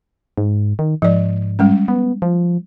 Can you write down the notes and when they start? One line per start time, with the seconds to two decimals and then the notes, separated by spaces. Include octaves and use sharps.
0.38 G#2
0.79 D#3
1.02 G#2 F3 D5
1.59 G3 G#3 C#4
1.88 B3
2.22 F3